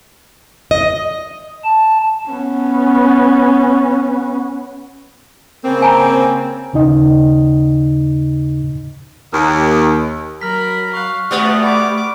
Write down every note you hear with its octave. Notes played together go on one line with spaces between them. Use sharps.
D#5
A5
B3 C#4
C#3 A#3 C4
G#5 A#5
D#2 C#3 D#4 D#5
D#2
F#3 A#4 B5 F6 B6
F5 C#6 F#6
G3 A3 B3 F#4 F#5
B5 D6